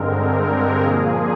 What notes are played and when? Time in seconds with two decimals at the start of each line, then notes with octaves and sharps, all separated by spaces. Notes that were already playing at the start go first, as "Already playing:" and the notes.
Already playing: G2 D3 G#3 C4 A#4
0.81 A#2 F3 A#3 G#4